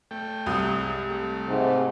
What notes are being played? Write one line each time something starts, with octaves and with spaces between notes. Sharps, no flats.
A3 G5
C2 D#6
G#3
A3
G#2 C3